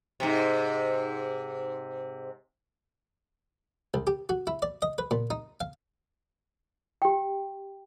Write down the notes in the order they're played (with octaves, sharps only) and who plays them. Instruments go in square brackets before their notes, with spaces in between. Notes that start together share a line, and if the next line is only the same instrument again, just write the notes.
[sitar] G#2 C3
[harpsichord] C2
G4
F#4
E4
D5
D#5
B4
A#2
D#4
F5
[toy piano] G4 G5